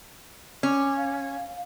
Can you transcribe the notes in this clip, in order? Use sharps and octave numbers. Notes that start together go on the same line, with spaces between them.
C#4 D6
F5